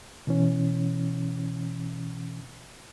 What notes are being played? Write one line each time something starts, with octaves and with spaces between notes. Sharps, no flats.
B2 E3 C#4